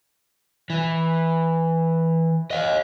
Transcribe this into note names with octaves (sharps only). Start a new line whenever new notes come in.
E3
D#5 F5